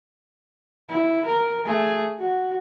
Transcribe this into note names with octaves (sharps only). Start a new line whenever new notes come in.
E4
A#4
A3 G#4
F#4